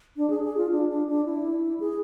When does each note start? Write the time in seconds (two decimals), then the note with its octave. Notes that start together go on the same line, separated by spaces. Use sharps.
0.17 D4
0.30 G#4
0.44 G#4
0.57 F4
0.71 D4
0.89 D4
1.08 D4
1.26 E4
1.80 G#4